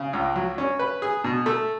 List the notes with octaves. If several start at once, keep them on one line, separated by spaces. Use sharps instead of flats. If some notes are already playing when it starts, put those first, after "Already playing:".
Already playing: C#3
C#2
F#3
C#4
B4
G#4
B2
A3